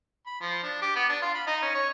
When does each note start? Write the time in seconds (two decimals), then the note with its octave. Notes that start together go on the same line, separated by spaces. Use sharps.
0.27 B5
0.41 F3
0.63 D4
0.82 G4
0.96 B3
1.10 D4
1.22 F4
1.35 B5
1.47 D#4
1.62 C#4
1.75 C#5